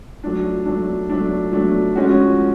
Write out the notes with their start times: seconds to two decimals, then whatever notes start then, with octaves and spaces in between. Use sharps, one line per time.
0.23 F#3 A3 D4
0.66 F#3 A3 D4
1.10 F#3 A3 D4
1.52 F#3 A3 D4
1.96 F3 G#3 C#4 F#4
2.39 F3